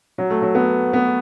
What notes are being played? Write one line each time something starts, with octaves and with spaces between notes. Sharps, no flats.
F#3
A3
F#3
B3
B3